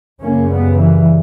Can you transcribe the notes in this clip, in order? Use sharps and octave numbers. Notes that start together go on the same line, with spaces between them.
F#2 C#3 A#3 C#4
G3 B3
E3 G3